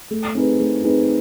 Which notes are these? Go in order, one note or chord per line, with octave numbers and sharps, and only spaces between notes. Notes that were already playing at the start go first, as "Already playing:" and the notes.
A3
C4 D#4 G#4 B4
A3
C4 D#4 G#4 B4